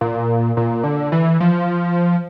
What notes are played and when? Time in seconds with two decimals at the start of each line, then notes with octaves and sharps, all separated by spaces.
0.01 A#2
0.57 A#2
0.84 D3
1.12 E3
1.40 F3